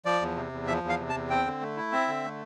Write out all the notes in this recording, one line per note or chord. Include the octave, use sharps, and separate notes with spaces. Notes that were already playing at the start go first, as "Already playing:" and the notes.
F3 D5
E2
C3
E2
F3 E5
E2
F5
C3
A5
E2
C4 G5
D3
A3
E4
C4 E5
D3
A3